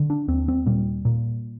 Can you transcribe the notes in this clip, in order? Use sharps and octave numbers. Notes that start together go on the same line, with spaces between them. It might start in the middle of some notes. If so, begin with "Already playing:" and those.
Already playing: D3
D4
D#2 C4
C4
A#2 G3
A#2